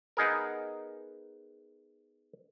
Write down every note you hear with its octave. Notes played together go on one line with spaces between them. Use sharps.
B3 D#4 G#4 A#4